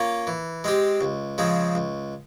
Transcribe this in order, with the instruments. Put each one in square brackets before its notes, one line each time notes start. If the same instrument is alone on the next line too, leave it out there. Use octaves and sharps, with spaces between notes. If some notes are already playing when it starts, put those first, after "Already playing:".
Already playing: [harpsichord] A#3 C#4 F4
E3
G#3 C4 G4
C#2
C#3 F3 G#3 C4
C#2